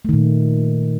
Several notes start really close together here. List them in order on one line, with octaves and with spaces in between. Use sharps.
A3 D#3 A#2